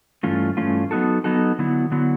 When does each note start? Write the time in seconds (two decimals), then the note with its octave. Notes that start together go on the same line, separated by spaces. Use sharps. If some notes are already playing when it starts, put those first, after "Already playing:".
0.23 G2 E3 A3 C#4 F4
0.57 G2 E3 A3 C#4 F4
0.91 F#3 B3 D#4 F#4 A4
1.24 F#3 B3 D#4 F#4 A4
1.59 D3 F#3 B3 E4
1.92 D3 F#3 B3 E4